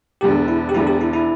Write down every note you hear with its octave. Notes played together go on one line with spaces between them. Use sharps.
E1 E2 D3 G4
E4
G4
E1 E2 D3 E4
G4
E4
E4